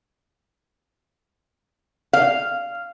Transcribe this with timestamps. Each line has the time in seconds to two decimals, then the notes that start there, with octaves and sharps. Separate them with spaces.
2.13 F5